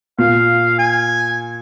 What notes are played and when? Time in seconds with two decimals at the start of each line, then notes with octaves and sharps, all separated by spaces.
0.19 A#2 F5
0.79 G#5